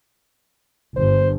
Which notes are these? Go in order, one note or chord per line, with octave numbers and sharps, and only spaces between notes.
G1 C5